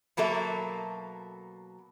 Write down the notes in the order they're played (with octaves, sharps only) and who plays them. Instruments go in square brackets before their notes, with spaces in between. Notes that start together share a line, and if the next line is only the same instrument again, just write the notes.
[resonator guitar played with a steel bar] B2 F#3 A#3 A4 E5